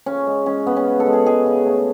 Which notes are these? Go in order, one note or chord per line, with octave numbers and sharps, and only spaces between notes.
C#3 C#4
G#3
G#3 C#4
C#3 B3
C#4
C#3
A4
G#3
G#4
G#3 G#4
C#3
A3